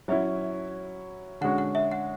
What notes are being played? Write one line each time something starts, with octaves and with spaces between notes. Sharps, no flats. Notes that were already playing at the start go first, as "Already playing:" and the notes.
F#3 C#4 E4 E5
D3 G#3 C#4 F#4 F#5
F#5
E5
F#5